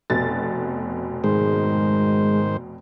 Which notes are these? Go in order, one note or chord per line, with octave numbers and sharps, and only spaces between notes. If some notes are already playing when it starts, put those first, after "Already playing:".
F1 B2 A6
G#2 D#3 G#3 C5